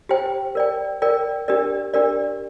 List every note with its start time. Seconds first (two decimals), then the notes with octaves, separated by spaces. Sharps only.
0.09 G4 C5 G5
0.55 A#4 D5 G5
1.02 A#4 D5 G5
1.48 D4 G4 A#4 D5
1.94 D4 G4 A#4 D5